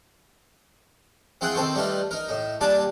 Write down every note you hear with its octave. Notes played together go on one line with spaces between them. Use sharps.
C4 E4 F4 G#4 F#5 G5
D#3 C4 A4 C5 C#6
G3 A3 D#4 F4 B4
D#4 A#4
A2 D#4
A#2 G3 D4 G#5 A5 D6